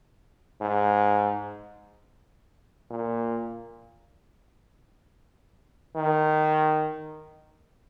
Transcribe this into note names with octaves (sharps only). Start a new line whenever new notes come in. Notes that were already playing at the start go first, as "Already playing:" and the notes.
G#2
A#2
D#3